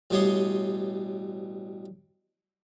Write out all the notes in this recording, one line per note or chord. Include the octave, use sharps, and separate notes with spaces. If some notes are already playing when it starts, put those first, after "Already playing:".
A1 B2 G3 C#5 C6 D#6